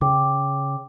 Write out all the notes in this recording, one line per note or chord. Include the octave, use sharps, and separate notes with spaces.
C#3 G5 D6